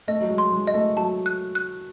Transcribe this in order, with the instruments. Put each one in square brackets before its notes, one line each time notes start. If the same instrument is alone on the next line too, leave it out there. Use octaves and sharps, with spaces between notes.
[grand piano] A3 [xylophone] D#5
[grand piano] F#3
G#3
[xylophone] C6
[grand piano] G#3
[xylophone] D#5
[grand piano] A3
[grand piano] F#3 [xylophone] A5
[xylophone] F#6
F#6